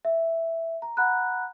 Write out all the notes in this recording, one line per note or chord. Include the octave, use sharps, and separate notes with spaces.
E5
A#5
F#5 A#5 B5 F#6